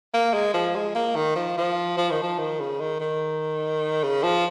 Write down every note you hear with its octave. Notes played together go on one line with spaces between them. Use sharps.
A#3
G#3
F3
G#3
A#3
D#3
F3
F3
F3
D#3
F3
D#3
C#3
D#3
D#3
C#3
F3